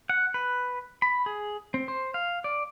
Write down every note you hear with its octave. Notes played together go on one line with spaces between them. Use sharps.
F#5
B4
B5
G#4
C4
C5
F5
D5